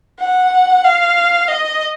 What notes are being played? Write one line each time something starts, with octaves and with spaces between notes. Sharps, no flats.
F#5
F5
D#5